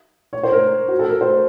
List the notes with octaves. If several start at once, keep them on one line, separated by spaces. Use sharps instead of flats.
C#5
C5
A#4
F#4
A4
A#4
C5